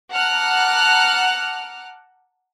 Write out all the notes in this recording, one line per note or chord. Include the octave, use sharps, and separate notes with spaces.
F#5 A5 A#5 D6 F6 F#6